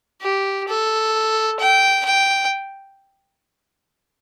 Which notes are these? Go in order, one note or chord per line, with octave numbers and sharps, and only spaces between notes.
G4
A4
G5
G5